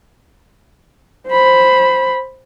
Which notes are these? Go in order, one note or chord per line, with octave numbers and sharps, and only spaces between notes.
C5 B5